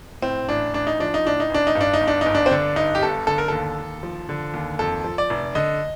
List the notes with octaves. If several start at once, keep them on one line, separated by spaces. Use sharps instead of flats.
A2 C4
A1 D4
A1 D4
D#4
F3 D4
D#4
A2 D4
D#4
A1 D4
D#4
G2
D4
D#4
G1
D4
G1 D#4
D4
C4
D3 D4
G2 D#4
G4
G1 A4
D3 A4
A#4
D#2 A4
D#2
F3
D3
D#2
F2 A4
F3
D5
F1
D3 D#5